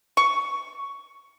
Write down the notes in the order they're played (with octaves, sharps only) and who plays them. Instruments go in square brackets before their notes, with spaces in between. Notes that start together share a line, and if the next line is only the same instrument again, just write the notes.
[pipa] C#6